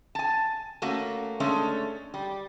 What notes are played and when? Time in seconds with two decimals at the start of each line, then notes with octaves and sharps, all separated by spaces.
0.15 G#5 A5
0.82 A3 A#3 C#4 F#4
1.40 G#3 A3 C#4 D4
2.14 G3